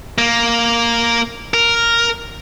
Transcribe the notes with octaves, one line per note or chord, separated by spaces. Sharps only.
A#3
A#4